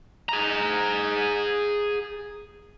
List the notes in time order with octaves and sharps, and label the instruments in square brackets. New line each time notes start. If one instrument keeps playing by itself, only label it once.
[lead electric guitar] G#4 A#5